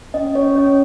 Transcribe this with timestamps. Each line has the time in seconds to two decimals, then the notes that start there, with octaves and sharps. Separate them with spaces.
0.14 C#4 D#5
0.35 C#4 C#5
0.55 C#4 D#5